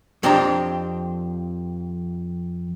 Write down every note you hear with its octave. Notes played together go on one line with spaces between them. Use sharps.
F2 C4 D4 G4 A#5